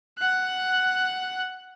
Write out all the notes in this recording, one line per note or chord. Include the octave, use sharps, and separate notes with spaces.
F#5 F#6